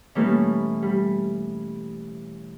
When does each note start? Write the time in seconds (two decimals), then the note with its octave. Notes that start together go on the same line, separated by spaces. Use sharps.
0.15 B2 E3 G3 A3 A#3 C#4
0.82 G3